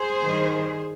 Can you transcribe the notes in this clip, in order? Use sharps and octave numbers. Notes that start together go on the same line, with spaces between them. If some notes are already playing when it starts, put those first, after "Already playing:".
Already playing: G#4 C5
G2 D#3 G3